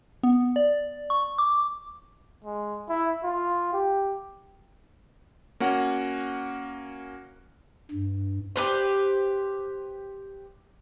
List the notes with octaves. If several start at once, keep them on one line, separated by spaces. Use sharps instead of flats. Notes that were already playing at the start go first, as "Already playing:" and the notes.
B3
D5
C#6
D6
G#3
E4
F4
G4
A#3 C#4 F#4 F#5
G2
G4 B4 C5